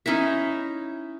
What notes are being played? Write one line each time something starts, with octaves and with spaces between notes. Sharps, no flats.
C#4 D#4 E4 E5